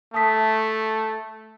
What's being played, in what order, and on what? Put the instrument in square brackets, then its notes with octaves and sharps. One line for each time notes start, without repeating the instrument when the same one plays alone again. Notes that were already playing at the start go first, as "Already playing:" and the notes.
[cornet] A3 [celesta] A5 D#6 B6